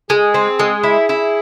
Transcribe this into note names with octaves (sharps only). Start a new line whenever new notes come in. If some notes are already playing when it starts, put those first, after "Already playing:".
G#3 G#4
C4
G#3
E4
E4